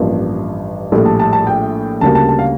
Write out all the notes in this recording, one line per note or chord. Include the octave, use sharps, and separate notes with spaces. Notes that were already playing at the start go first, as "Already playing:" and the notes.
Already playing: A1 G2 F3 A#3
A#1 A2 G3
A5
A5
A5
G5
D2 C#3 G3 A#3 A5
A5
A5
F5